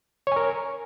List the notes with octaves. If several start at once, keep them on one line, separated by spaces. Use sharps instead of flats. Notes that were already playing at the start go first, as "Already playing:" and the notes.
A#4 C#5 G#5